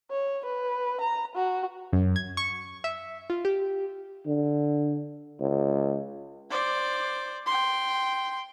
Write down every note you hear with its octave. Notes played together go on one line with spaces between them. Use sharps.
C#5
B4
A#5
F#4
F#2
G#6
C#6
E5
F4
G4
D3
C#2
C5 D5
G5 C6